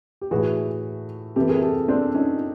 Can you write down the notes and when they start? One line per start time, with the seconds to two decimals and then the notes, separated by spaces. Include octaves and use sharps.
0.22 G4
0.31 A2 E3 F#4 G#4
1.36 C3 E3 G4 A4
1.49 G#4 A#4
1.62 G4 A4
1.88 C4 D4
2.15 C#4 D#4